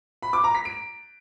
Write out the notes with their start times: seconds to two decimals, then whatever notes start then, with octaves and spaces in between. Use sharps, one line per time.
0.22 B5
0.33 D6
0.44 A#5
0.55 B6
0.65 D7